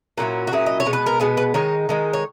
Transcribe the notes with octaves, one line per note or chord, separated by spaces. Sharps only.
A#2 F#3 C#4 E4
F#4
A#2 F#3 C#4 E4 G#4
D#5
C#5
B2 G#3 B3
B4
A#4
B2 G#3 B3 G#4
B4
D#3 G#3 D#4 C#5
D#3 G#3 D#4
C#5